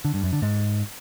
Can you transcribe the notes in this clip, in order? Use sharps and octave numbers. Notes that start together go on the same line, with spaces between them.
D3
G2
F#2
D3
G#2